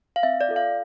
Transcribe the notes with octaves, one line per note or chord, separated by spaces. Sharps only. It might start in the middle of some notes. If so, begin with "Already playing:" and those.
F5
C4 E5
D5
F4 A4
F5